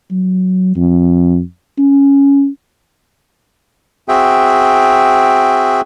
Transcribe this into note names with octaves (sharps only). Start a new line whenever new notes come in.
F#3
F2
C#4
C4 F#4 G#4 E5 G5